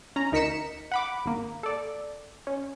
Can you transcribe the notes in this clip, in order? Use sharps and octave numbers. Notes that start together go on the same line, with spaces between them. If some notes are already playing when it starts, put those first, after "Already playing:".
C#4 A#5
D2 D#4 A#4 B6 C#7 E7
F#5 B5 D6
G#1 A#3
A4 D5
C#4